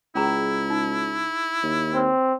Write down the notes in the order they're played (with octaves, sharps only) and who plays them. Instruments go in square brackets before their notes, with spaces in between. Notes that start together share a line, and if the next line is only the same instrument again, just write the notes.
[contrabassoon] C#2 [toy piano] C#4 G#4 A#5 [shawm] E4
[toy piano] D#4
[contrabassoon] D#2
[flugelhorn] C4 [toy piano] B4 C#5